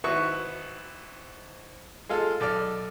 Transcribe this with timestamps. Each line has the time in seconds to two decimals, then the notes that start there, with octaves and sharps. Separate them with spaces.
0.04 G#1 E4 F#4 B4 C#6
2.09 G#3 F4 A4
2.40 B1 A4 D5 D6 F6